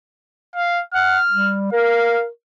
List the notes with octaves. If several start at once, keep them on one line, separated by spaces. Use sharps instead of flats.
F5
F#5 F6
G3
A#4 F5